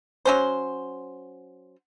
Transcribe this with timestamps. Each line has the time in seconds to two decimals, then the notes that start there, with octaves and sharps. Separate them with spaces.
0.25 F#3 C#4 C5